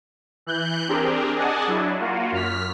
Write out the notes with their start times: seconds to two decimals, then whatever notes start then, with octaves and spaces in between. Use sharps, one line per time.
0.46 E3 F#6 G6
0.88 C4 D4 G4 G#4 A#4
1.36 G#4 D5 D#5 F#5 G#5 A5
1.67 F#3 D4 E4
2.00 A#3 F4 F#4
2.32 F#2 F6 B6